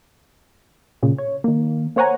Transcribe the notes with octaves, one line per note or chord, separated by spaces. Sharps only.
A#2 C#3
C#5
D#3 A#3
A#3 C5 C#5 F#5 G#5 A#5